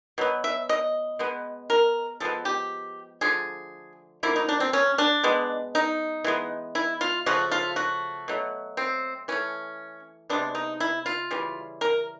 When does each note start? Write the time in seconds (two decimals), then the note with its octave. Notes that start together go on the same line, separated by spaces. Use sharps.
0.18 B2 F#3 B3
0.44 E5
0.69 D#5
1.19 B2 G#3 B3
1.70 A#4
2.20 D3 F3 G#3 B3 A4
2.45 G4
3.21 D3 F3 A3 G#4
4.23 D3 F3 A#3 E4
4.36 D#4
4.49 D4
4.60 C4
4.73 C#4
4.98 D4
5.23 B2 G#3 B3
5.75 D#4
6.24 E3 G#3 B3
6.75 E4
7.01 F4
7.26 C#3 F3 A3 F#4
7.51 F4
7.76 F#4
8.28 B2 F#3 A3
8.77 C4
9.28 E3 A3 C#4
10.29 C3 F3 G#3 B3 D4
10.55 D#4
10.80 E4
11.06 F4
11.31 C#3 E3 G3
11.81 A#4